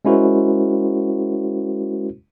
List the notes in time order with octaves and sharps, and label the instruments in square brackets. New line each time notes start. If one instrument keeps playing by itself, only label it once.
[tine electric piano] G#3 C#4 E4 F#4 A#4 C5